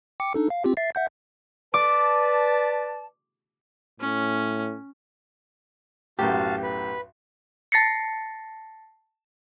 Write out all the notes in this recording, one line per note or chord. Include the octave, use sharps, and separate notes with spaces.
G5 D6 C#7
D4 D#4 A4
F5
C4 F4 G4
E5 A6 C7
E5 F#5 G6
B4 D5 A5 D6
A2 C#4
B1 F#2 A2 F#4 G4 F5 A5
B4
A5 A6 A#6 C7 C#7